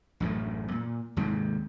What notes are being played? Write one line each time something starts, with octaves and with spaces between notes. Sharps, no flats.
A1 F#2 A2 A3
A#2
D#2 G#2 C3